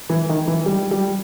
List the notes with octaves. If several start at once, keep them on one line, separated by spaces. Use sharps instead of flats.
E3
D#3
E3
G3
G3